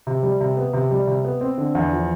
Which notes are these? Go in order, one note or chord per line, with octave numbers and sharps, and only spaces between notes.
C3
G3
C3
B3
C3
G3
C3
B3
C4
D3
E2
F3